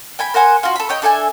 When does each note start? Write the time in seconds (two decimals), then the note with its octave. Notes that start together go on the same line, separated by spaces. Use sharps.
0.19 G5 G#5 B5
0.34 A#4 C5 F#5 G#5
0.63 F4 F#4
0.76 A4 B5
0.89 C#5 D#5 G5
1.02 D4 A4 E5 G#5